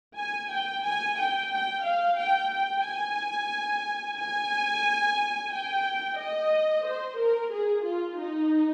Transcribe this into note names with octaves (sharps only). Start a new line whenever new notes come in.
G#5
G5
G#5
G5
G5
F5
G5
G5
G#5
G#5
G5
D#5
C5
A#4
G#4
F4
D#4